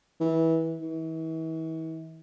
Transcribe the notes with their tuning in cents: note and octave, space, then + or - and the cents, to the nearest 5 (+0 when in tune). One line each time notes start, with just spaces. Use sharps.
E3 -20
E3 -40